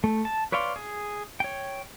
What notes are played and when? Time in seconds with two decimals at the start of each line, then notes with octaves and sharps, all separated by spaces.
0.04 A3
0.25 A5
0.52 B4 C#5 D5 F5 C6
0.76 G#4
1.40 C#5 G5